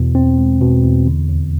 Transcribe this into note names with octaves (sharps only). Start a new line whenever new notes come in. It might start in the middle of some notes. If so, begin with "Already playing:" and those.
Already playing: E2 B2
C4
G#3
B2
E2
D3
D#2